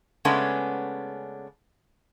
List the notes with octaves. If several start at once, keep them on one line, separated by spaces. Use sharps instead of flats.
C#3 G#3 A3 B3 C#4 D4